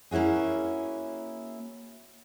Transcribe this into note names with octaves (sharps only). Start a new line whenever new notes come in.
A#3 C#4 E4 F#4 G#4